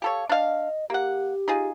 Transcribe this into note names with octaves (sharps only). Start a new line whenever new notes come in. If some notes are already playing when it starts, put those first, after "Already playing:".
G4 A4 C#5 F5
D4 D#5 F5
A#3 G4 F#5
D#4 F4 G#4